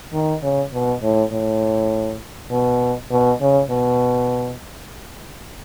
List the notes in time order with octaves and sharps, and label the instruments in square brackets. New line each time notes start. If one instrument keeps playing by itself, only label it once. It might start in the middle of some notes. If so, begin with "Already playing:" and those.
[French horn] D#3
C#3
B2
A2
A2
B2
B2
C#3
B2